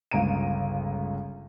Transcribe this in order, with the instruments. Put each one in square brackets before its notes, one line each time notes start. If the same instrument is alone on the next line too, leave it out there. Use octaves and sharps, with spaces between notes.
[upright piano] G1 C#2 C#3 A#5 D7 D#7